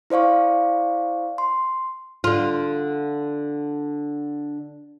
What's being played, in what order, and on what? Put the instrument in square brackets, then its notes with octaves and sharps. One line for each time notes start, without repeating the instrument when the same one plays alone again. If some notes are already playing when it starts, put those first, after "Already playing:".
[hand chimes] E4 C5 D5 F5 C#6
C6
[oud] D3 F4